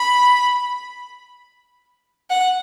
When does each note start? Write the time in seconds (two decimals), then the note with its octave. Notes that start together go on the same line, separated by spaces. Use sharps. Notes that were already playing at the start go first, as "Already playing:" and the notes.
Already playing: B5
2.30 F#5